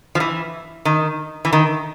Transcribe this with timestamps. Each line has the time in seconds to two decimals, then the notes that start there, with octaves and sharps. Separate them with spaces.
0.15 F3
0.20 E3
0.85 D#3
1.45 E3
1.53 D#3